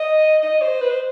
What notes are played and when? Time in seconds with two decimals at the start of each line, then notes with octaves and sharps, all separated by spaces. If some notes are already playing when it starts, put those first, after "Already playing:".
Already playing: D#5
0.43 D#5
0.62 C5
0.81 B4
0.90 C5